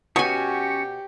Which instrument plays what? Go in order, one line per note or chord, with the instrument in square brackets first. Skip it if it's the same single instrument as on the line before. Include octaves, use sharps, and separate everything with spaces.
[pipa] B2 [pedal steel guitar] C#4 F#4 [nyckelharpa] G4 [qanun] C#5 G#5